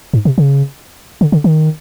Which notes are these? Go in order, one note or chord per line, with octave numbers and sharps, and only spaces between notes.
G#2
C3
C#3
D3
D3
D#3